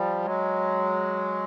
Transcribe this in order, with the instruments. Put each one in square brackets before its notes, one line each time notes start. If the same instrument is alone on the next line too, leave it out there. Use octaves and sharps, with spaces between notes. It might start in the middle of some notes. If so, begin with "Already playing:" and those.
Already playing: [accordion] F3 G3
F#3 G#3